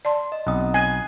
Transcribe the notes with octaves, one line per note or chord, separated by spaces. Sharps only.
D5 A5 C6
D#5
B1 C4 D#5 D#6
G#5 D#6 F#6 C7